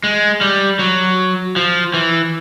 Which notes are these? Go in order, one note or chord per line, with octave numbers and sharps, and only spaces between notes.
G#3
G3
F#3
F3
E3